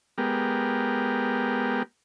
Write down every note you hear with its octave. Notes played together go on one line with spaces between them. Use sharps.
G#3 B3 G4 A#4